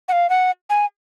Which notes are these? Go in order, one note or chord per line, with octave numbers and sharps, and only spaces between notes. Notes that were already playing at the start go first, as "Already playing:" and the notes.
F#5
F5
F#5
G#5